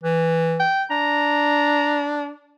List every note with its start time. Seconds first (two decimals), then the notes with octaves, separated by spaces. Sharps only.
0.04 E3
0.60 G5
0.91 D4 A#5